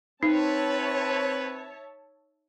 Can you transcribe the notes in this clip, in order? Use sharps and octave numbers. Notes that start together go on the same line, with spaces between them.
C4 D#4 B4 C#5 E5 A5